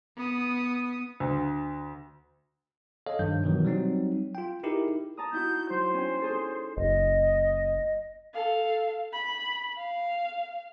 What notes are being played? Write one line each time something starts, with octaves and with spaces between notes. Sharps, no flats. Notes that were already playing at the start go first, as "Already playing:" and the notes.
B3 D#6
D2
A4 C#5 D#5 F5
G2 D#3 F3 G6
B2 D#3 E3 F#3
F#3 G3 C4 D#4
F4 G5
D#4 E4 G4 G#4 A#4
A5 A#5 D#6
D#4 E4 F#4 G6
F#3 C5 C6
C#4 G5
C#4 G#4 A4
F#1 D#5
A4 F5
B5
F5